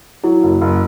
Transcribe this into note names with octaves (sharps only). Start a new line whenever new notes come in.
F#3 E4
F#1
F#1